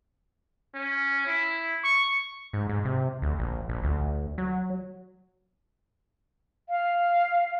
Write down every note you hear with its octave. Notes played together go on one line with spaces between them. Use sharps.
C#4
E4
C#6
G#2
G#2
C3
D2
A#1
A#1
D2
F#3
F5